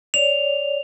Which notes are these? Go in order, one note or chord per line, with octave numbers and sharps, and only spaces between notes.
C#5 D5 F7